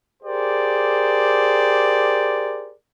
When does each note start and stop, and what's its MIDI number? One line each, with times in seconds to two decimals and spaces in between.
0.23 2.73 67
0.23 2.73 68
0.23 2.73 70
0.23 2.73 72
0.23 2.73 74